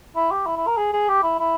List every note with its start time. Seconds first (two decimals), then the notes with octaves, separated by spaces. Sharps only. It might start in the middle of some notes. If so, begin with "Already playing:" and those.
0.16 E4
0.31 G4
0.46 E4
0.57 E4
0.67 A#4
0.78 G#4
0.93 G#4
1.09 G4
1.23 E4
1.39 E4